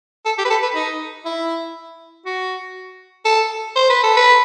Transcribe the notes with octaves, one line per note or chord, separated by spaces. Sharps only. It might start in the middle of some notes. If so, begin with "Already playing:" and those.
A4
G4
B4
A4
B4
D#4
E4
F#4
A4
C5
B4
A4
B4